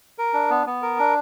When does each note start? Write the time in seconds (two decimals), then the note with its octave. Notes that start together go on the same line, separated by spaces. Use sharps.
0.18 A#4
0.33 D4
0.51 B3
0.67 B3
0.82 A#4
0.99 D4